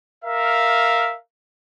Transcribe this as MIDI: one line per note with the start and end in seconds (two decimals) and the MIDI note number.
0.25 1.15 70
0.25 1.15 76
0.25 1.15 77